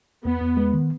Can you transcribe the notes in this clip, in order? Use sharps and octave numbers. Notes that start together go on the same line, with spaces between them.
E2 B3
E2
G#3
D#3